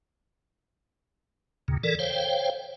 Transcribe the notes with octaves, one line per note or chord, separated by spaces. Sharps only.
D#2 A#2 C#3
E3 A4 A#4 D5
C5 C#5 F5 G5